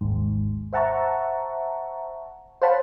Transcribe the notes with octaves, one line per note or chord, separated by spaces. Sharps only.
G#1 D#2 G#2
C5 E5 F#5 A5 A#5 C#6
C5 C#5 F5 F#5 A5 B5